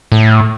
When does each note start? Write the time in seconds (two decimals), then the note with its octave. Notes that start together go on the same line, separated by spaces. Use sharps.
0.12 A2